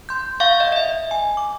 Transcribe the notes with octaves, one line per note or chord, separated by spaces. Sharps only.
C6 G6
F5 F#5 C#6 G6
D#5
D#5 E5
G#5
D6